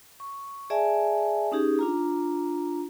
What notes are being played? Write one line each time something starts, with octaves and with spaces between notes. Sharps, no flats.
C#6
G#4 D5 E5 G#5 A5
C#4 D#4 G4 G#4
D4 F4 A#5